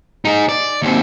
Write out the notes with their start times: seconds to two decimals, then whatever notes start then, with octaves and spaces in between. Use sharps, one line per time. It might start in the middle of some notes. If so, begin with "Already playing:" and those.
0.25 D#4 G#4
0.49 D5
0.82 D#2 C4